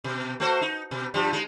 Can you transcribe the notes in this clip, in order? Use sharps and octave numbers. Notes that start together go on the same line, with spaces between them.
B2
A3 F#4 C5
D#4
B2
G2 F3 G3
G#3 D#4